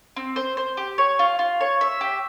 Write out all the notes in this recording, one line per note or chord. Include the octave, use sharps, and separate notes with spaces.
C4
C5
C5
G4
C#5
F4
F4
C#5
E5
G4